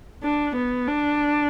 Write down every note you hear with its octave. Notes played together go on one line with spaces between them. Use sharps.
D4
B3
D4